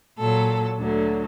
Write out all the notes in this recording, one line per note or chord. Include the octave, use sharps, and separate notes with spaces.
A#2 F#3 A4
D2 D3 F#3